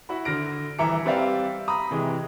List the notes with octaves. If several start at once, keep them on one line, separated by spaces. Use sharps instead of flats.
E4 F#4 B5
D3 F6 A#6 D7
D#1 E3 E5 A#5 D6 C#7
G3 C4 B4 D5 E5 F5
A#5 B5 D#6
C3 E3 G#3